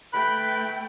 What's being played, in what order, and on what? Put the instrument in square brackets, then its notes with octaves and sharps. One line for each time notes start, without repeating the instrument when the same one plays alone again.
[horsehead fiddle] A3 G5 [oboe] B4 [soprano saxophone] B5